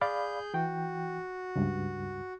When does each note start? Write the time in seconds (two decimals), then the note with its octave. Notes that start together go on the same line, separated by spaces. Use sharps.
0.01 G#4 D5 F5 B5 G6
0.54 E3 F#4 G5
1.56 C#2 G2